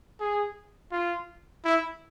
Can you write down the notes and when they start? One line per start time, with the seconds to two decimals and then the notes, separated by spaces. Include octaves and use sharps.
0.20 G#4
0.92 F4
1.65 E4